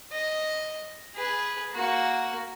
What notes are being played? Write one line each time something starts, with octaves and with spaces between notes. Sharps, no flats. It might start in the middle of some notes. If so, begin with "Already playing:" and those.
D#5
G#4 B4
A#3 F#4